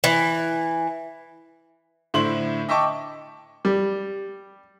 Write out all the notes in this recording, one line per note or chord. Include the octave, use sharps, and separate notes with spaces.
E3
A2 D3 E4 C5 C6 F#7
D#5 E5 G5 A5 C#6 D6
G3